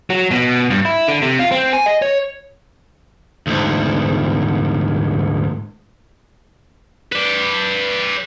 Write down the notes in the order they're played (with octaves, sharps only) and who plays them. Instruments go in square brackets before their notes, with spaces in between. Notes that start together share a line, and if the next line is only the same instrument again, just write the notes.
[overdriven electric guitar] F#3
B2
G2
E4
D3
C3
F4
C4
G#5
D#5
C#5
D2 G#2
[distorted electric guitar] B4 D5